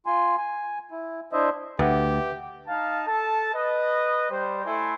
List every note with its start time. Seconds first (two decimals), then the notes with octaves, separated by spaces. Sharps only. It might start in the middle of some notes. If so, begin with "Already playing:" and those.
0.06 F4 G#5 C6
0.38 G#5
0.91 E4
1.33 D4 E4 C5 D#5 E5
1.79 D2 G4 B4 E5 F#5
2.68 D#4 F5 A5
3.07 A4 A5
3.53 B4 D#5
4.30 G3 C5
4.65 A3 E4 A4 G#5 C6